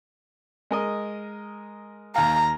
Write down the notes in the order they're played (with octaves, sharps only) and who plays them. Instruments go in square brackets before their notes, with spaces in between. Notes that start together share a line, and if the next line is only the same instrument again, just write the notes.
[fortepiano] G#3 A#4 D#5
[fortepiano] D#2 F5 [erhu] A#5